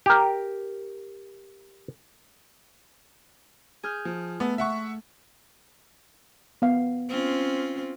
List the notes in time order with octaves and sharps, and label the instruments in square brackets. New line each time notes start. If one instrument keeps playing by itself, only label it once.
[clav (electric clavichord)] G4 A#4
[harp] G#4 F6 G6
[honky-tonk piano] F3
[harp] A3 [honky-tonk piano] B3
[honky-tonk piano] E5 F#5 C#6
[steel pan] B3 F5
[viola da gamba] C4 C#4 F4